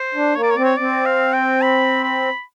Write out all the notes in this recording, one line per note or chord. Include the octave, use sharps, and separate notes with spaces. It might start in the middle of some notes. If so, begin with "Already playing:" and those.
Already playing: C5
D4
A#3 C#5
D5
C#5
C4 D5
C#5
C4 D5
F5
G5
B5
B5